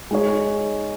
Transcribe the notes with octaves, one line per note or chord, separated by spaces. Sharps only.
G#3 D#4 G#4 C#5